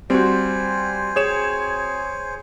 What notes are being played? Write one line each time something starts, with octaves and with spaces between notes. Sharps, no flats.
G3 C4 F#4 C5 G#5
G#4 C#5 E7